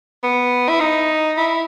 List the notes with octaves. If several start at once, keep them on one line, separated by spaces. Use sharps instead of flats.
B3
E4
D#4
E4